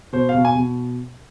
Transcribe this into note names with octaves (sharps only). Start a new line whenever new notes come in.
B2 C5
F5
B2
G#5
B2